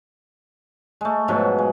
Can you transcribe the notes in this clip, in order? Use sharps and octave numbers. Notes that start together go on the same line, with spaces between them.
G#3 A3
G#2 B2 F3 F#3
G#3